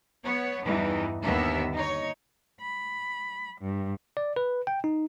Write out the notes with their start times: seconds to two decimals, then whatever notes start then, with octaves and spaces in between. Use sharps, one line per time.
0.23 B3 C#5
0.65 E2 G2 E3 G3 D#4
1.22 D#2 D3 A#3 B3 E5
1.73 D#4 C#5
2.60 B5
3.60 G2
4.17 D5
4.36 B4
4.67 G5
4.84 D#4